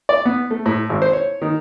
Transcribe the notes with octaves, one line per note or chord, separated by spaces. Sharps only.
D5
B3
A3
A2
G#1
C5
C#5
D#3